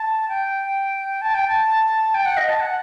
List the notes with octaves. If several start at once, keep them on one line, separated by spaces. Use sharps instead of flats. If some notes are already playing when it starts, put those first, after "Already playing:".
Already playing: A5
G5
A5
G5
A5
G5
F#5
D#5
A5
F#5